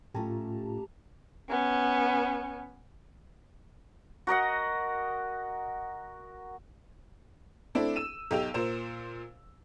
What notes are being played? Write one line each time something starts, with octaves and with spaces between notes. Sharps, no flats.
A2 A3 C#4 F4 G4 A5 A#5
B3 C#4
F#4 A#4 D#5 F#5
A3 C4 D4 E4
E6 D#7 E7
B1 D#4 G4 E6 F7
A#2 A#4 C5 E7